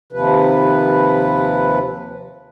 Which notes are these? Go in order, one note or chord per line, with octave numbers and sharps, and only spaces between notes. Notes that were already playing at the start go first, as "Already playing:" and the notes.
D#2 C3 F3 B4